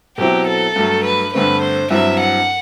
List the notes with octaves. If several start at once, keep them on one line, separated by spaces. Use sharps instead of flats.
B2 F#3 C4 E4 G4
A4
G2 F#3 A3
B4
G2 D3 A3 C4 B4
C5
G2 F#3 C4 E4 E5
F#5